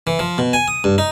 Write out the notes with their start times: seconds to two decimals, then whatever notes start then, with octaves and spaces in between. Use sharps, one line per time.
0.07 E3
0.19 F3
0.38 B2
0.53 G#5
0.68 D#6
0.84 G2
0.98 D#4